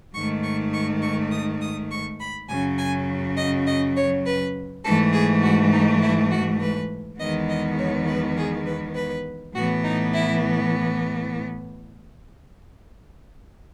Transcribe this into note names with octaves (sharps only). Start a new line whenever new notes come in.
G#2 D#3 A3 C#6
C#6
C#6
C#6
D#6
D#6
C#6
B5
F#2 C#3 F#3 G#5
G#5
D#5
D#5
C#5
B4
G#2 E3 A3 A4
G#4
F#4
D#4
E4
F#4
B4
E2 D#3 G#3 B3 D#5
D#5
C#5
B4
G#4
B4
B4
A2 E3 B3 F#4
D#4
E4